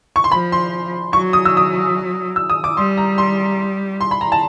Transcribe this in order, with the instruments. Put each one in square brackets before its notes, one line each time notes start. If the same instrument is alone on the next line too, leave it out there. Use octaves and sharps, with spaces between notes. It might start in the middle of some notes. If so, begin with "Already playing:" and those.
[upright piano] C#6
C6
[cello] F3 [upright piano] B5
[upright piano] C6
[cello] F#3 [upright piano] C#6
[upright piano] D#6
E6
D#6
E6
D#6
D6
[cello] G3 [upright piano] C6
[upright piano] A#5
C6
C6
B5
A#5
A5